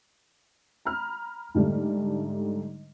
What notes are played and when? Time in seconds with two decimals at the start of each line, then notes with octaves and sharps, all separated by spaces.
0.85 A#5 B5 F6
1.55 G#2 D3 G3 A3